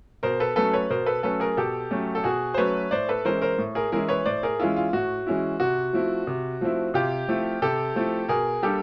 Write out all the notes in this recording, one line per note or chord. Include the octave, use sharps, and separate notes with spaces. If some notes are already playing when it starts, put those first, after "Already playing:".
B2 A#4 C5
A4 B4
F#3 A3 C#4 A4 B4
B4 C#5
B2 A#4 C5
A4 B4
F#3 A3 C#4 A4 B4
G#4 A#4
B2 G4 A4
F#3 A3 C#4
A4
B2 F#4 G#4
C5
F#3 A3 C#4 B4 C#5
A2 C5 D5
A4 B4
E3 G#3 C#4 E4 A#4 C5
A#4 C5
A2
G#4 A#4
E3 G#3 C#4 E4 G#4 A#4
B4 C#5
A2 C5 D5
G#4 A#4
E3 G#3 C#4 E4 F4
F4
A2 F#4
E3 G#3 C#4 E4
C3 F#4
F3 A3 C4 E4
C3
F3 A3 C4 E4
C3 F4 G4
F3 A3 C4 E4
C3 G4 A4
F3 A3 C4 E4
B2 G#4 A#4
G3 A#3 D4 G4 A4